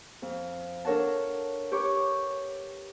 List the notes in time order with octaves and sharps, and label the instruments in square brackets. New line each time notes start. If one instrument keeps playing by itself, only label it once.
[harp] F2
D4 A4 A#4 C#5 F#5 A5
G4 B4 C#5 C#6 D6